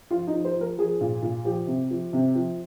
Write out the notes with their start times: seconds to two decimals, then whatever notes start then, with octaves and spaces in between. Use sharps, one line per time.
0.11 F3 F4
0.27 D#4
0.33 F3
0.45 C5
0.56 F3 A#4
0.78 F3 G#4
1.00 A#2
1.22 A#2
1.45 F3 G4
1.67 C3
1.91 F3
2.13 C3
2.35 F3